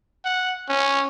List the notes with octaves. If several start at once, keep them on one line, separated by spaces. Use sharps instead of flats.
F#5
C#4